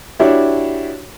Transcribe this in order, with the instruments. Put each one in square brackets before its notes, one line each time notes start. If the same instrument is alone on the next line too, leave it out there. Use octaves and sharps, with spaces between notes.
[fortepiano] D4 E4 F#4 G4 C#5